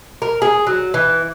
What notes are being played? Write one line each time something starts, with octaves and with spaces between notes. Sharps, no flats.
A#4
G#4
F#3
E3